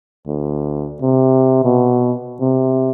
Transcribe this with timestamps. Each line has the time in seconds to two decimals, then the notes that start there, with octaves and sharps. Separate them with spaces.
0.27 D2
1.02 C3
1.65 B2
2.40 C3